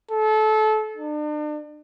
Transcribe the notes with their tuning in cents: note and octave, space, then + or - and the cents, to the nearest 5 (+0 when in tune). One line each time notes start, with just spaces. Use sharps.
A4 -25
D4 +40